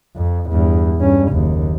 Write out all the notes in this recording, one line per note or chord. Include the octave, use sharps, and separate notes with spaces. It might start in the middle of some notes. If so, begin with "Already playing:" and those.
F2
E2 G2
G2 C#4
F#1 D#2